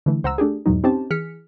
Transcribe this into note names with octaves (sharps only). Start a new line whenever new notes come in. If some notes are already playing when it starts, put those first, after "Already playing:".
D3 E3 A3
C#2 C5 F#5 A#5 E6
A3 D4 G4 G#4
E2 G#2 B2 F#3 D#4
C4 C#4 D#4 G4 C5 A5
E3 G#4 F6 B6 C#7